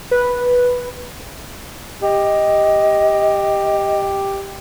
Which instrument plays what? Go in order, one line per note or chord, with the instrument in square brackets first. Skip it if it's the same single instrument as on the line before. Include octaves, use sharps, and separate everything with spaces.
[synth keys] B4
[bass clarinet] G4 [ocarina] D#5